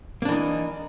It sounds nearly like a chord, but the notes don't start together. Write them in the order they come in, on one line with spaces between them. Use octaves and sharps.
A#3 D4 E3 D#4